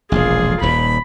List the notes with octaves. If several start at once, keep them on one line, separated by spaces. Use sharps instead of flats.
E1 A#1 F4 G#4
D#1 D#2 B5